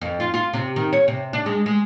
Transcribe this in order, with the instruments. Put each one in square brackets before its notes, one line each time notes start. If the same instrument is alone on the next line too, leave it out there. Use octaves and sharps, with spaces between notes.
[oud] F2
F4
F4
C3
D#3
C#5
C3
D4
G#3
G#3